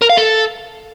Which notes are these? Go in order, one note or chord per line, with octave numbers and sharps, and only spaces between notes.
A#4
F5
A4